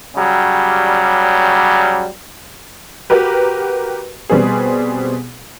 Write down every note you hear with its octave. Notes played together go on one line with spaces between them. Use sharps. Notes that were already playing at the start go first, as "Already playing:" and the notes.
C#3 F#3 G3
F#4 G4 A#4 B4
B2 G3 B3 C4 G#4